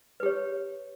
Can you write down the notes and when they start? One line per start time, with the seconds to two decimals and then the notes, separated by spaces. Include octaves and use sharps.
0.20 B4
0.23 G4
0.26 C#5